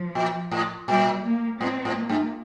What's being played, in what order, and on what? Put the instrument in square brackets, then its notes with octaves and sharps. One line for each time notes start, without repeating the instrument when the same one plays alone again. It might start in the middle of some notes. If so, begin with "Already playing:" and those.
Already playing: [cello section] F3
[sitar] A#2
A2
[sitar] A#2 [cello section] G3
[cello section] A#3
[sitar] A2 [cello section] C4
[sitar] A2
[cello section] A#3
[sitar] G2